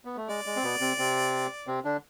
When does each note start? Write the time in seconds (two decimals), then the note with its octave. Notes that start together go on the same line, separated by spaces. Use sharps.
0.05 B3
0.17 A3
0.28 G#3 D5
0.46 G#3
0.56 C4
0.63 B2 B3
0.80 C3 C4
0.98 C3 C4
1.67 C3 C4
1.85 D3 D4